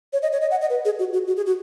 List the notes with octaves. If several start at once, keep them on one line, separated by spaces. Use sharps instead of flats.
C#5
D#5
C#5
D#5
F#5
D#5
B4
G#4
F#4
F#4
F#4
G#4
F#4